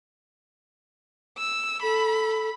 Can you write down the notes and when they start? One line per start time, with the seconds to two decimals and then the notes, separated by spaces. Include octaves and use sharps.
1.38 E6
1.83 A4 B5